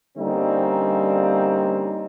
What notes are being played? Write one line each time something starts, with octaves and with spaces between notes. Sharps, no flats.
D3 G3 A#3 C4 C#4 D#4